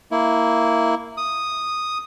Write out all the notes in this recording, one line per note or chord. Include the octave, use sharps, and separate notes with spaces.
A#3 E4
D#6